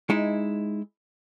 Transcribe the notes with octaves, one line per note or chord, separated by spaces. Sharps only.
G#3 D#4 E4